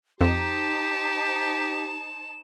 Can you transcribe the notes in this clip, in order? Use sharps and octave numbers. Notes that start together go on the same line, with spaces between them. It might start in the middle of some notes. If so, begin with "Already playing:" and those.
F2 D#4 G4 C5 A5 E7